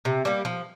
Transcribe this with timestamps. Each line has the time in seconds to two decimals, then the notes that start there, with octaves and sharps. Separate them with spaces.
0.05 C3
0.25 G3 A#3
0.45 F3